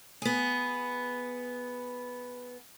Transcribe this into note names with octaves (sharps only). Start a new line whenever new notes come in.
B3 G#4